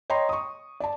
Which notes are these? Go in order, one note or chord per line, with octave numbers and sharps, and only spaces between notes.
C#5 D#5 G5 A#5 C6
C#6 D#6
D5 A5